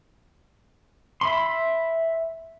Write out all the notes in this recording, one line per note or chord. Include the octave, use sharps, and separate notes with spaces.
E5 B5 C6